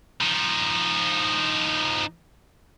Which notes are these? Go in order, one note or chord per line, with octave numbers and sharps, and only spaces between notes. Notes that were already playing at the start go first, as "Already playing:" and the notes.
F3 D#4